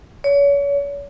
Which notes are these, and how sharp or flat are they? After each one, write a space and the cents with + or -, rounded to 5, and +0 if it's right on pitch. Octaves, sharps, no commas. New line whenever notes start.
C#5 +35